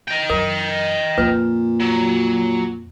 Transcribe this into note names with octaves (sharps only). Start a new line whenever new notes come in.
D#5 G5
F#2 A#4
F2 A#2 C4 B4
F#3